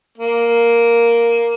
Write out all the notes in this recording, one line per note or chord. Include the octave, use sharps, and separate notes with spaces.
A#3